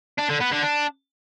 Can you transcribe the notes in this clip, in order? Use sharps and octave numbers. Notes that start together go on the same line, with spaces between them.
D4
D3
B3
D3
D4